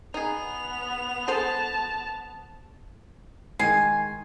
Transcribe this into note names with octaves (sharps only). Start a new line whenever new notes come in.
B3 D#4 G#4 F7
G#4 A4 C5 A5
D#3 G#3 G#5 C7